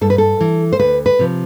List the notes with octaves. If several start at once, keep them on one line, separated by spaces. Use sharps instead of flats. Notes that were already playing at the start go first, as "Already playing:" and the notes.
G2 A4
B4
A4
E3
C5
D2 B4
B4
C3 F3